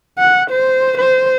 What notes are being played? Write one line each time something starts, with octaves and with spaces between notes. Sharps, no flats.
F#5
C5
C5